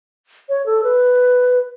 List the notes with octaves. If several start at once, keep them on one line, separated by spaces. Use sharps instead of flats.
C#5
A4
B4